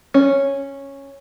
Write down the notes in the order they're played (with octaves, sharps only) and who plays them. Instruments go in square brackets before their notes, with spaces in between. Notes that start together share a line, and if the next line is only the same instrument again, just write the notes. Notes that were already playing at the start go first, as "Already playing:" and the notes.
[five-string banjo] C#4